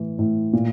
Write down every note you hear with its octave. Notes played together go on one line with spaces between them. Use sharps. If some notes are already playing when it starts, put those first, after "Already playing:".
Already playing: A2 E3
A2
A#2